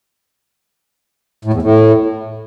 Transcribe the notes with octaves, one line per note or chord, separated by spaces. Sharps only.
A2
E2
A2